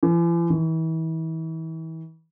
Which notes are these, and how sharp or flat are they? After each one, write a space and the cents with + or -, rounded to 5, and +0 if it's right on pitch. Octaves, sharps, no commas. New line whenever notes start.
E3 +45
E3 -35